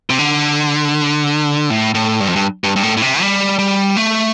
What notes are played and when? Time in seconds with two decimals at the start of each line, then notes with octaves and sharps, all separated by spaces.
0.10 C3
0.19 D3
1.70 A2
1.95 A2
2.20 G2
2.28 F2
2.36 G2
2.64 G2
2.76 G2
2.83 A2
2.97 A2
3.02 C3
3.21 G3
3.59 G3
3.97 A3